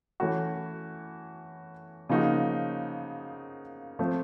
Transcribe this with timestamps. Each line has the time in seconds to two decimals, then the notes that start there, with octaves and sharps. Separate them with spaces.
0.20 E3 A3 C#4 F#4
2.09 C#3 F3 A#3 D#4 F#4
3.99 F3 A3 C4